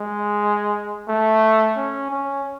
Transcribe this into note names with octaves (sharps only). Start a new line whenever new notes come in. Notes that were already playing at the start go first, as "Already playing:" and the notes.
Already playing: G#3
A3
C#4
C#4